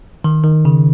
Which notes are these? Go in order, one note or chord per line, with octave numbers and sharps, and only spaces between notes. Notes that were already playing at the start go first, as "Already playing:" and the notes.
D#3
D#3
C#3